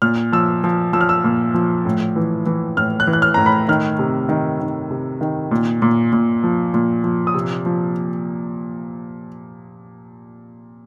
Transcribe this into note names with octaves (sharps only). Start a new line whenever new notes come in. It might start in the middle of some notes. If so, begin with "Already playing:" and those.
A#2 F6
F3 E6
F3
F3 E6
F6
E6
A#2
F3
A2
E3
E3
A2 F6
F#6
E3
F#6
F6
A2 A#5
B5
D#3 F6
C3
D#3
D#3
C3
D#3
A#2
A#2
A#2
F3
A#2
F3
D#6
C3 E6
F3